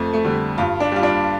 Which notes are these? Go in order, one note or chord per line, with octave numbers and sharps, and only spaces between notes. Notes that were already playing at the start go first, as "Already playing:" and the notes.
Already playing: F2 A3
A3
D3 G3
G2 F4
D4
G3 F4
D4